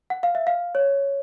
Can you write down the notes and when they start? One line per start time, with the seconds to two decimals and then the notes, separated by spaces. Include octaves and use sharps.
0.10 F#5
0.23 F5
0.35 E5
0.47 F5
0.75 C#5